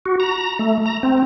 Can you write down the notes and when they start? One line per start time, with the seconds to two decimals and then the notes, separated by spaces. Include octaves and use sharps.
0.06 F#4
0.20 A#5
0.59 A3
0.86 A#5
1.03 C4